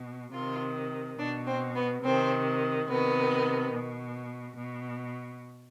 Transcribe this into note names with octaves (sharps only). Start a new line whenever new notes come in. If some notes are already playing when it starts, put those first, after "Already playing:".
Already playing: B2
C3 D#3 F4
B2 D4
C4
B3
C3 D#3 C4
C3 D#3 B3
B2
B2